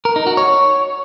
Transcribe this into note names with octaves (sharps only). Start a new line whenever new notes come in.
A#4
D#4
F#4
C#5